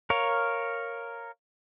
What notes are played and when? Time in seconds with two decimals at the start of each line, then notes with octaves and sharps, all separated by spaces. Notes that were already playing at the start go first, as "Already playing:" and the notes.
0.10 A#4 C#5 F5